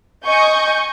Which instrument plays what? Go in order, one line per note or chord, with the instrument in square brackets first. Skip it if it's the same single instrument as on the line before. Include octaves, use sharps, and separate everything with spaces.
[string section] D#5 G#5 C#6 G6